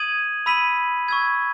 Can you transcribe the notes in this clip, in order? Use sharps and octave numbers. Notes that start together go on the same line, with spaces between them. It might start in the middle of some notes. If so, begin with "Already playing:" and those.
Already playing: D#6 G#6 D#7 F#7
B5 E6 B6 D#7 F#7
C#6 E6 G#6